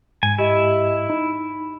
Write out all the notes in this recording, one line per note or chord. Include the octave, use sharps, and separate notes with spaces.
G#2 G#5
E4 G4 D#5
D#4 B5